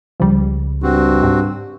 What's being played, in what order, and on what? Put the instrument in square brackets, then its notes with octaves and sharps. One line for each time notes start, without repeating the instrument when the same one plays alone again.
[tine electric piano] C#2 C#3 [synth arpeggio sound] F3 G3
[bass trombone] G2 [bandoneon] C4 F#4
[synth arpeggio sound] G#2 G4